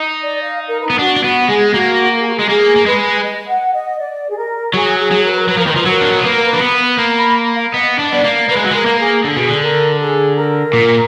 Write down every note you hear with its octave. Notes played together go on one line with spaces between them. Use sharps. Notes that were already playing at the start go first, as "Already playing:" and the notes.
Already playing: D#4
D5
F5
A#4
B4
B3
D4 F#4
D4
B3 F#4
G#3 G#4
A#3 F#4
A#4
G#4
F#4
G#3 G#4
A#3 G#4
A#3
G#3 B4
D#5
F#5
D#5
D5
G#4
A#4
F#3 G#4
G#4
F#3
A#4
B4
A#4
F#3 B4
F3 A#4
D#3 B4
F3 A#4
B4
F#3 A#4
D4
B3
A#3 B4
A#4
B4
D4
B3
A#3 A#5
B5
F5
B3 D#5
D4
B3 D5
A#3
A#3 B4
G#3
F#3
G#3 A#4
A#3
G#4
D3 G#4
B2
D3
A#4
G#4
A#4
A#2